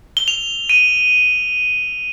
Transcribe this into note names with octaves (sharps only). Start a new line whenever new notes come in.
G7
F7
D#7